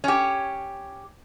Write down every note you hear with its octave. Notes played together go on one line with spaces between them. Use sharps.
C#4 G4